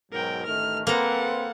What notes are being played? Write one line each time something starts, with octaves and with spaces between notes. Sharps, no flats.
G#2 B2 F#3 A#4 G5
A1 D#3 A3 F6
A#3 C4 A4 B4 F#5 A#5